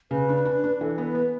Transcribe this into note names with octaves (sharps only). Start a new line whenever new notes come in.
C#3 B4
D4
D4
D4
E3 A4
B3
B4
B3